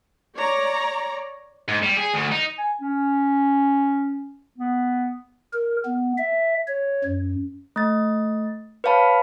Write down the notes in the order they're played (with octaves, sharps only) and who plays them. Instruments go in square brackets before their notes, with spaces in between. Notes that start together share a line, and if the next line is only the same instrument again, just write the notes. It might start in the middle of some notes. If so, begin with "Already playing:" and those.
[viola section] C#5 D5 A#5
[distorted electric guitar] G#2
G3
G#4
D2
D#4
[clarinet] G#5
C#4
B3
[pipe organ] A#4
B3
E5
C#5
F#2
[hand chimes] A3 A6
B4 C#5 F5 A5 B5